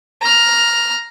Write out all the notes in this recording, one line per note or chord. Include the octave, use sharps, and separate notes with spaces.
A#5 F6